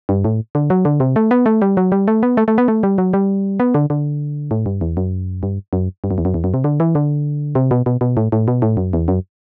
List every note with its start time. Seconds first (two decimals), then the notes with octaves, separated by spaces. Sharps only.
0.09 G2
0.25 A2
0.55 D3
0.70 F#3
0.85 D3
1.00 C3
1.16 A3
1.31 B3
1.46 A3
1.62 G3
1.77 F#3
1.92 G3
2.08 A3
2.23 B3
2.37 A3
2.48 A3
2.58 B3
2.68 A3
2.83 G3
2.98 F#3
3.13 G3
3.60 B3
3.74 D3
3.90 D3
4.51 A2
4.66 G2
4.81 E2
4.97 F#2
5.43 G2
5.73 F#2
6.04 G2
6.11 F#2
6.18 E2
6.25 F#2
6.34 E2
6.44 F#2
6.54 C3
6.64 D3
6.80 E3
6.95 D3
7.55 C3
7.71 B2
7.86 B2
8.01 B2
8.17 A2
8.32 A2
8.48 B2
8.62 A2
8.77 F#2
8.93 E2
9.08 F#2